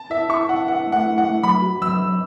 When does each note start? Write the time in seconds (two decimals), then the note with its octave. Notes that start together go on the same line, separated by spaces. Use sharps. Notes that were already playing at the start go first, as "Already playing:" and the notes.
Already playing: A5
0.10 E4 E5
0.30 E4 C#6
0.49 E4 F#5
0.67 E4 F#5
0.87 A3
0.92 F#5
1.06 E4
1.18 F#5
1.24 A3
1.43 F#3 B5
1.62 F#4
1.82 F#3 E6
2.01 F#3